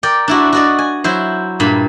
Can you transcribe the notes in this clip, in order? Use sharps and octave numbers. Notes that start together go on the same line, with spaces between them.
A#4 D5 G5
D4 E4 F#4
F#4 D5 D#5
G#5
F#3 E4 C5
G2 A#2 B5